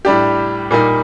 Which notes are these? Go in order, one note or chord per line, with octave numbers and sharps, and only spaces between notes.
A2 G3 D4 G4
A#2 G3 A#3 D#4